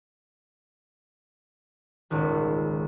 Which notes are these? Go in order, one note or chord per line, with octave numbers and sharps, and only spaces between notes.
D#1 G#1 C#2